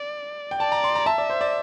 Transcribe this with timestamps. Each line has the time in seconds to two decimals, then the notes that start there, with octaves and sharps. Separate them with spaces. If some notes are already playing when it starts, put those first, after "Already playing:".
Already playing: D5
0.51 G5
0.60 D5 A5
0.72 A#5
0.84 C6
0.95 A#5
1.06 E5 A5
1.18 D5
1.30 C5
1.41 D5